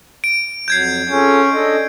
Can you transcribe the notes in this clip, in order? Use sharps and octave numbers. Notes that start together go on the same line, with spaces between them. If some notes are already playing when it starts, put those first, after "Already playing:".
D7
F2 F#3 G6 G#6 C7
C#4 F4 G#4 A4
D4 A4 D#5